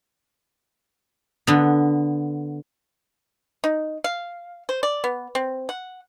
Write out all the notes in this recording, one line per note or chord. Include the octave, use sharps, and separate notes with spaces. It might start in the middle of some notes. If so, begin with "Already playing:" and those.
D3 B3
D#4
F5
C5
D5
B3
C4
F#5